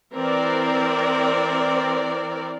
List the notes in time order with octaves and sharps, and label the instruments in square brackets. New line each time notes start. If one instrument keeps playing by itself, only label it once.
[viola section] E3 C4 A#4 D5